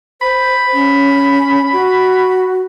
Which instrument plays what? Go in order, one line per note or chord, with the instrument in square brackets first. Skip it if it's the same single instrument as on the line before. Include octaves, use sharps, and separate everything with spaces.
[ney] C5 [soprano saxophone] B5
[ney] C#4
F#4